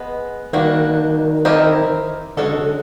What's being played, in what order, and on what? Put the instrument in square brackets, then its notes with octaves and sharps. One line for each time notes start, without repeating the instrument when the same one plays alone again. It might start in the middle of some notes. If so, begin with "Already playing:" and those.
Already playing: [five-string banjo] G#3 B3
[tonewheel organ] D#3 [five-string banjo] G3 A#3 D4 F#4
[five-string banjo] C4 E4 G4 A#4 D#5
[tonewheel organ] D3 [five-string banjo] G#3 C#4 F#4 A4